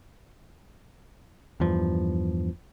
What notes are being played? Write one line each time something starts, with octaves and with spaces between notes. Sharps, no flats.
E2 G2 F3